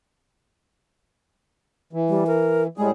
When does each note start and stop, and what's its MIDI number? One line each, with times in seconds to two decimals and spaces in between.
1.93 2.67 52
2.09 2.24 55
2.27 2.63 70
2.78 2.91 45
2.78 2.91 55
2.78 2.88 56
2.78 2.91 68